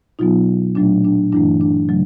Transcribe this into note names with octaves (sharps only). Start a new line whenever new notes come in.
B2 F#3 B3 D#4 F4
A#2 F#3 A3 D4
D4
G2 E3 A3 D4 E4
D4
C#3 F#3 A3